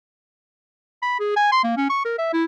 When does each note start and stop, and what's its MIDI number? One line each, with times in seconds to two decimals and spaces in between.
1.03 1.18 83
1.20 1.34 68
1.36 1.47 80
1.52 1.63 84
1.63 1.77 58
1.77 1.85 61
1.90 2.02 85
2.05 2.18 70
2.19 2.31 76
2.33 2.45 64